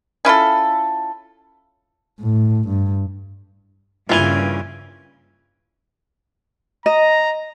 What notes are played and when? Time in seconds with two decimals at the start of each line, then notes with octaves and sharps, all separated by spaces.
0.25 C#4 E4 F4 A4
2.21 A2
2.68 G2
4.09 G2 A#2 C#3 E3 F4 G#5
6.86 D#5 A#5